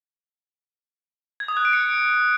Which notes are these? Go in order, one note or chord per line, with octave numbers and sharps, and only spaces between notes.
G#6
D#6
F#6
D7
C#7